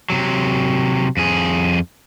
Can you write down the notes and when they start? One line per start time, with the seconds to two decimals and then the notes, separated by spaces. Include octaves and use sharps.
0.10 C3 F#3
1.17 F2 G#4